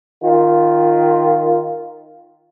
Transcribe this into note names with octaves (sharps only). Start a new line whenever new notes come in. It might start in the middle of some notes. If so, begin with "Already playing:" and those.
D#3 F4